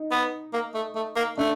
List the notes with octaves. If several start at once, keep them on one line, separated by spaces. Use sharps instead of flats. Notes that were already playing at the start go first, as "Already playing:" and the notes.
Already playing: D#4
B3
A#3
A3
A3
A#3
A3 D4